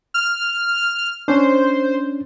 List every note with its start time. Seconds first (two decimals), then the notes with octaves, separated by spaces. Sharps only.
0.14 F6
1.28 C#4 D4 C5